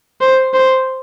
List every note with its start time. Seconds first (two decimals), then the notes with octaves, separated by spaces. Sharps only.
0.21 C5
0.54 C5